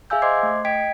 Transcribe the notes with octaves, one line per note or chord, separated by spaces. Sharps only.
G#4 E5 F5 G#5 E6 G6
C5 D#5 C6 D6 G#6 C7
A3
D#5 G5 G#6 B6 D7